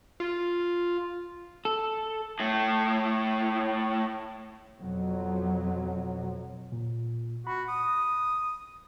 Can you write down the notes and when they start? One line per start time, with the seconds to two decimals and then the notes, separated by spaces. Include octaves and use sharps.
0.20 F4
1.65 A4
2.39 A2 A3
4.81 F2 B2 F#3
6.72 A#2
7.47 F#4 B5
7.69 D#6